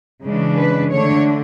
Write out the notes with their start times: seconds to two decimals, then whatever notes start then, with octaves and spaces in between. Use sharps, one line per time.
0.24 C#3 E3 G#3 D4
0.57 B4
0.91 D3 A3 D4 C#5